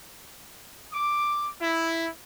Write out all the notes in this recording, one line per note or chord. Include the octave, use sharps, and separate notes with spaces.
D6
E4